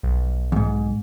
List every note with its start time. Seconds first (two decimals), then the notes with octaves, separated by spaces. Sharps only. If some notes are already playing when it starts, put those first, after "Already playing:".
0.03 B1
0.52 E2 G#2